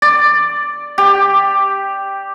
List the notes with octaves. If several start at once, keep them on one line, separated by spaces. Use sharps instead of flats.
D5
G4